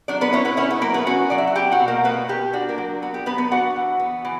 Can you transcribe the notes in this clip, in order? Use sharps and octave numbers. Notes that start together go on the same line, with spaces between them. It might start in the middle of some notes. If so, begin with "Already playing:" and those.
F#3 D4 D5
B3 B4
C#4 E4 C#5
B3 B4
C#4 E4 C#5
B3 B4
F#3 A#3 A#4
B3 B4
C#4 F#4 F#5
F#3 D5
E5
F#5
E4 G4 G5
F#4 F#5
B2
A#3 A#4
A#3 B3 B4
B2 G4
D4 F#4
A#3 A#4
F#3
B3 F#4
G4
F#3 B3 B4
B3 B4
D4 F#4 F#5
E3
B3
E3